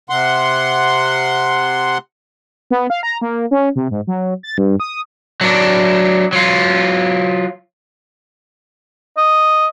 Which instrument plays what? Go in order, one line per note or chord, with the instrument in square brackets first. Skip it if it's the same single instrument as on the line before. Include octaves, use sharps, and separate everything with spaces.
[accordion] C3 F#5 C6
[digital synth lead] B3
F5
A#5
A#3
C#4
C3
G#2
F#3
A6
G2
D#6
[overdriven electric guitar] F#3 D4
F#3 F4
[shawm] D#5